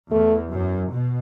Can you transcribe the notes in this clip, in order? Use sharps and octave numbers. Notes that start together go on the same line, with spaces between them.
E2 A3
F#2
B2